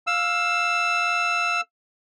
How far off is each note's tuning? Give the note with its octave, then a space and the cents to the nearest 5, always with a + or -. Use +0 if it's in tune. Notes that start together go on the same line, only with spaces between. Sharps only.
F5 +10 E6 +10